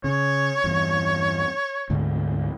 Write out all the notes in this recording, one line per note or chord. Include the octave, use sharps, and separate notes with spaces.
C#3 C#5
E2 G2
D2 G#2 D3